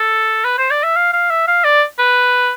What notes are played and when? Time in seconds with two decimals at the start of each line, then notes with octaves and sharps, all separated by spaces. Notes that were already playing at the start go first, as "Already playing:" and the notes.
Already playing: A4
0.45 B4
0.58 C5
0.71 D5
0.83 E5
0.96 F5
1.13 F5
1.30 E5
1.47 F5
1.64 D5
1.99 B4